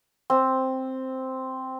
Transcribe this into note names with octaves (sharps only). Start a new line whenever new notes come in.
C4